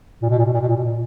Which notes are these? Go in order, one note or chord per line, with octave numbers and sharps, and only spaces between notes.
A#2
B2
A#2
B2
A#2
B2
A#2
B2
A#2